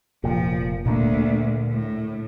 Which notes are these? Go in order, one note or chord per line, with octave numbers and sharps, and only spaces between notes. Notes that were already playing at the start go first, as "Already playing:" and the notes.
F1 A#2 F3
D2 A#2 D3 A#3
A2